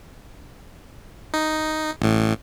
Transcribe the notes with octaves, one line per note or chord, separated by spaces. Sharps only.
D#4
A1 A2